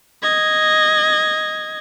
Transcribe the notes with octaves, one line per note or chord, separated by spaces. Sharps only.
D#5 G#6